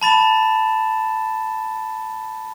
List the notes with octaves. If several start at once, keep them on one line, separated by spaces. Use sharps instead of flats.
A5 B5 A6 E7